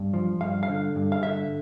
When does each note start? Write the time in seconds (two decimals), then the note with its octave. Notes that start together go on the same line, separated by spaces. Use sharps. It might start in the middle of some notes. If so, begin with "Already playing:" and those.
Already playing: G2
0.14 F3
0.41 G2 F5
0.63 F5
0.68 D3
0.96 G2
1.12 F5
1.23 D3 E5